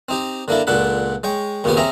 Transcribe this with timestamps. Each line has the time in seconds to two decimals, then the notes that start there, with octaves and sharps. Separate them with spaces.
0.09 C4 D#4 G4
0.48 D3 A#3 D4 E4 A4
0.67 C#2 A#2 D4 A4 F#5 B5
1.23 G#3 C#5 G5
1.64 D#2 A#2 C#3 B3 G4 G#5
1.77 C4 C#4 G#4 E5 A#5